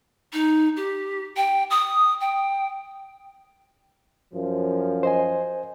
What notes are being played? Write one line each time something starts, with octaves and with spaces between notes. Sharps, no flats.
D#4
G4
G5
D#6
G5
F#2 F3
C5 D#5 G#5